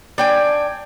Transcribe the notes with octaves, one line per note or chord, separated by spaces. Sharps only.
D4 G5 G#5